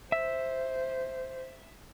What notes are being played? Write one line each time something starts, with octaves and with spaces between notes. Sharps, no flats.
C5 E5